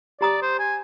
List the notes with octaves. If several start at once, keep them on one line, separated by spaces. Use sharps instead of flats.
G4 D5 A#5 D#6
C5
G#5